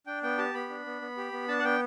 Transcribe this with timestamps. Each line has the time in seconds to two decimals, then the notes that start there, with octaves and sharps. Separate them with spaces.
0.07 D4 G5
0.23 B3 G5
0.38 G4 A5
0.54 B3 B5
0.70 D4
0.86 B3
1.02 B3
1.17 G4
1.32 B3
1.48 D4 A5
1.59 F#5
1.64 B3 G5